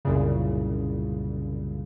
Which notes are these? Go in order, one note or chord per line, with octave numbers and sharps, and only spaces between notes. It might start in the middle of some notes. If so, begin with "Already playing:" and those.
C2 F#2 A#2 C#3